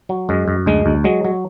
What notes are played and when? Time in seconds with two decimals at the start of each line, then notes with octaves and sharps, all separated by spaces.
0.09 F#3
0.29 F#2 G#3
0.48 F#2
0.66 D2 G#3
0.86 D2
1.04 F#3 G#3
1.24 F#3